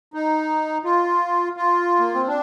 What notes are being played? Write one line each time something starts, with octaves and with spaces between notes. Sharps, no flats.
D#4
F4
F4
A#3
C4
D4